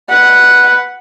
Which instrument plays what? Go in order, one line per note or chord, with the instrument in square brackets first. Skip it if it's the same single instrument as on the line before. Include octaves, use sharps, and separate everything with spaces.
[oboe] B4 [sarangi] F#5